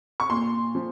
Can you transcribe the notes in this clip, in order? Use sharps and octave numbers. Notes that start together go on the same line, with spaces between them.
C#6
A#2 C6
F3